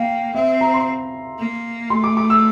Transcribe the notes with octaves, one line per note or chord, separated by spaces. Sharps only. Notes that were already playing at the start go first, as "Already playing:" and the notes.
Already playing: A#3 F5 G5
C4 E5
A#5
C6
A#3
A3 C6
D6
D6
E6